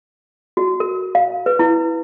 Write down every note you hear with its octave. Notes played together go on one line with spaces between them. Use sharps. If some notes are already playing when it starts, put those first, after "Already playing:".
F#4
A#4
F5
B4
E4